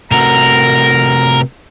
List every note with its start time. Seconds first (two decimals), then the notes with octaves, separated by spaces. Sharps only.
0.12 C3 A3 F#4 A#4 A#5